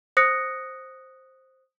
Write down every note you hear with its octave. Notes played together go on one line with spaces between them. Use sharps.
C5 D#6 F#6 A#6 C#7